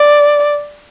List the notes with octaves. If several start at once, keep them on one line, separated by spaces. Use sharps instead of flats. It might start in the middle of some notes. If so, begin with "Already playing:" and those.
Already playing: D5